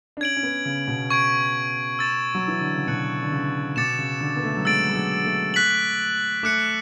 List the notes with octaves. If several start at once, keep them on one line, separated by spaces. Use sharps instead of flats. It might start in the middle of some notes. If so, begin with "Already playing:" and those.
D4
C#4 G#6 D7 F#7
C#4
B3
C#3
B2
C#6 G#6 D7
E6 A6 E7
F#3
E3
D3
C#3
B2 F#6 C#7 F#7
D3
C#3
B2 D6 A6 C#7 E7
C#3
D3
B3
A3
F#3
G#3 E6 A6 D7 F#7
G#3
F#3
A3
F#6 B6 F#7
A3 D6 F#6 C#7